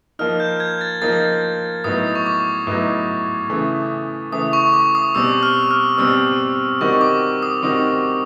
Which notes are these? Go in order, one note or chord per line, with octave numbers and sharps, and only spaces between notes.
F3 A#3 D#4 F6
G6
G#6
A6
F3 A#3 D#4 A6
A2 F#3 B3 D#4 D#6
C#6
D6
A2 F#3 B3 D#4
C#3 E3 A3
C#3 E3 A3 D#6
C#6
D6
D#6
B2 G3 C4 E6
F6
F6
B2 G3 C4 E6
D#3 G3 C4 D#4 F#4 C#6
D6
D#6
D#3 G3 C4 D#4 F#4